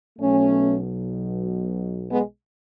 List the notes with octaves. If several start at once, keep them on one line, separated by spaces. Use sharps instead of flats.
B1 B2 F#3 A3 C#4
G#3 B3